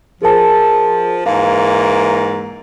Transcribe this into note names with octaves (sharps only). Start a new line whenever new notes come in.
F3 G#4 A#4 A5
G#2 E3 A#3 F5